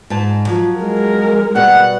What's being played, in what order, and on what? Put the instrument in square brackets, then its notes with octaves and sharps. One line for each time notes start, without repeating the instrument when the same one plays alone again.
[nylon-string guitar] G#2 G#3 A5
F3 F#3
[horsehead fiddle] G#3 A#4
[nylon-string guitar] B2 G3 [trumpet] F#5